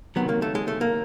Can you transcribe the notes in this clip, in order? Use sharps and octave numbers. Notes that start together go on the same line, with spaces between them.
C#2 C3 D#3 F#3 B3
A#3
A3
G#3
A3
A#3